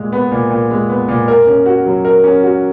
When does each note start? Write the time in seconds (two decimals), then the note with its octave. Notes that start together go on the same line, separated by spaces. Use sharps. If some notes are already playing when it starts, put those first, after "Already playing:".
Already playing: A#2 G#3
0.12 B3
0.31 A#2
0.50 A#2
0.71 G#3
0.89 B3
1.08 A#2
1.28 A#4
1.47 C#4
1.66 F#4
1.85 F#3
2.05 A#4
2.24 C#4
2.43 F#4